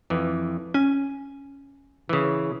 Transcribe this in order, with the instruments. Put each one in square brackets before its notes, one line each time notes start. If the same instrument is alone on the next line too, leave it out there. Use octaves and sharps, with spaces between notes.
[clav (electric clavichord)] F2 E3
[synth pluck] C#4 [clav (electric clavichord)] G#5
[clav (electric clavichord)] C#3 E3